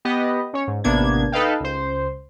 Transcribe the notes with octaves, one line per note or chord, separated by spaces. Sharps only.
B3 G4 B4 D#5
C#4 C#5
G#2
A1 C3 A#3 B3 D4 G#6
D#4 A4 B4 D#5 F5 G5
C#2 C5